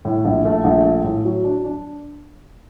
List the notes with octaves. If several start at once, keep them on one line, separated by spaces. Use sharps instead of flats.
A2
A#1
A3
A#1
A3
A2
F#3
D4
D4